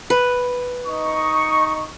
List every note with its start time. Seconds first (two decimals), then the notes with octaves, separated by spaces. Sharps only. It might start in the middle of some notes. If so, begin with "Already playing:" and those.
0.10 B4
0.87 D#4 D#5 C#6